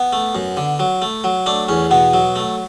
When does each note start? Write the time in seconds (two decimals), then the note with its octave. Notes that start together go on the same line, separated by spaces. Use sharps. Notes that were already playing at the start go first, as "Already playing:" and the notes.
Already playing: B3
0.13 A3
0.35 F#2
0.57 D3
0.79 F#3
1.02 A3
1.24 F#3
1.46 A3 D4
1.69 E2 C#4
1.91 B2 B3
2.14 F#3
2.36 A3